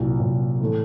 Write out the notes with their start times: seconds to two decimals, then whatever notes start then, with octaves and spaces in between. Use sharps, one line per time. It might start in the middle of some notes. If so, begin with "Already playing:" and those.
Already playing: C2 A#2 F#3
0.20 C2 A#2 F#3
0.60 A2 E3 A3